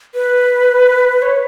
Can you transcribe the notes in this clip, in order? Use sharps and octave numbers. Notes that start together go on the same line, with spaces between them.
B4
C#5